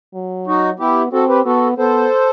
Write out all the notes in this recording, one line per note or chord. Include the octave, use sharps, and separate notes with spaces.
F#3
D#4 F#4
B3 E4 G4
C4 F#4 A4
G4 B4
B3 F#4 A4
B3 A4 C5